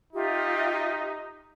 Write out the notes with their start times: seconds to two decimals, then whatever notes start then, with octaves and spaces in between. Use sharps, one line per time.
0.13 D#4 F4 G4 E5